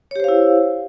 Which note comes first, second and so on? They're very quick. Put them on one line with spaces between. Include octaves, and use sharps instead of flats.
C#5 G4 C5 F5 E4